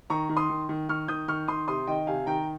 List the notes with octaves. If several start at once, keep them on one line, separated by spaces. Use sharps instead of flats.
D#3 A#5 C#6
D#3
C6 D#6
D#3
D#3
D#3 C#6 F6
D#3 D#6 G6
D#3 C#6 F6
D#3 C6 D#6
C3 C6 D#6
D#3 D#5 G5
C3 F5 G#5
D#3 G5 A#5